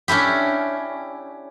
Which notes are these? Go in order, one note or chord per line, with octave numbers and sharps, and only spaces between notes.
C#4 D4 E4 G4